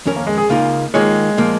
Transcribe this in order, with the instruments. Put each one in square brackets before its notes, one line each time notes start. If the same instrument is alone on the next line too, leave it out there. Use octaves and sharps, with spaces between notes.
[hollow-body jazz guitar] F2 D#3 C#4 A#4 C#5
[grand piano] A#3
G#3
G#4
[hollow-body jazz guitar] C#2 C#3 A#3 D#4 [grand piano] F4
[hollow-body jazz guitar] D#3 A#3 F4 G#4 C#5 [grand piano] G#3
[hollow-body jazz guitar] A#2 F3 A#3